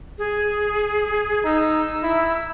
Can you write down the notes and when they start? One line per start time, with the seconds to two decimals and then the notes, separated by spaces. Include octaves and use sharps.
0.18 G#4
1.45 D#4 E6
2.03 E4